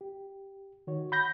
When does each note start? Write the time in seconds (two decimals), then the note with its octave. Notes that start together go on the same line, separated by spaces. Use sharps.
0.01 G4
0.87 D#3 F#4 C#5
1.12 F#5 B5 G6 A#6